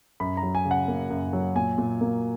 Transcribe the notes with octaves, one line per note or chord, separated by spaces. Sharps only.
F#2 B5
A#5
F#3
G#5
C#3
F#5
A#3
F#2
F#3
A#2 G#5
A#2
A#3